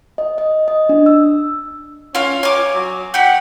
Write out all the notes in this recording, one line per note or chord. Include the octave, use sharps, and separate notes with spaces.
D#5
D#5
D#5
D4
E6
C#4 F4 F5
C#5 G#5 D6
F#3
F#4 G4 F#5